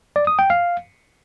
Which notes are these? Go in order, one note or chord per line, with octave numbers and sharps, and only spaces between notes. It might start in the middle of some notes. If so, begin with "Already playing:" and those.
D5
D#6
G5
F5